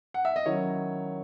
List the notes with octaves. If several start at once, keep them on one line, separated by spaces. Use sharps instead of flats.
F#5
E5
D#5
D#3 F#3 C#4 E4 C#5